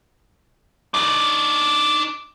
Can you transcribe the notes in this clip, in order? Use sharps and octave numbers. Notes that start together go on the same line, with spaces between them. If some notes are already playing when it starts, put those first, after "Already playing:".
D4 D#4